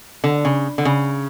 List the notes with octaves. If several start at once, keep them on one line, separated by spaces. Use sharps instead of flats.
D3
C#3
D3
C#3